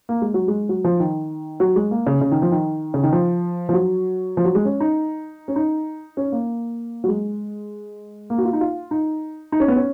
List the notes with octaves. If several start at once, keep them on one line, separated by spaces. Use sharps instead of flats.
A#3
G#3
F#3
G#3
F#3
F3
D#3
F#3
G#3
A#3
C#3
C#3
D#3
F3
D#3
C#3
D#3
F3
F3
F#3
F3
F#3
G#3
C#4
D#4
C#4
D#4
C#4
A#3
F#3
G#3
A#3
F#4
F4
D#4
F4
D#4
D#4
C#4
B3
C#4